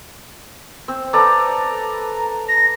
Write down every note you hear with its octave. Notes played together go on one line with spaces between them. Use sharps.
C4
A4 B4 D5 A#5
A#6